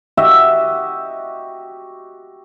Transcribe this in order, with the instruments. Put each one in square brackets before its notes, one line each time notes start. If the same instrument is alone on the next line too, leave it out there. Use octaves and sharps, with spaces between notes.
[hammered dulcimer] F#4 G4 D#5 E5